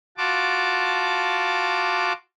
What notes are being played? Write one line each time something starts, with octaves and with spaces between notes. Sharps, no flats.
F4 F#4 A5 D6